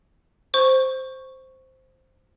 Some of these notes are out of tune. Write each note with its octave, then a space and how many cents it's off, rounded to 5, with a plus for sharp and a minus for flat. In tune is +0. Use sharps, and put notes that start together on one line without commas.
C5 +0 C#6 +0